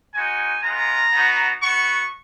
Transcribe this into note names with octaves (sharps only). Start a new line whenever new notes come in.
G#3 D#4 F#4 G#5
G#3 B3 F4 A#5
B3 D#4 F#4
B3 F#4 C#6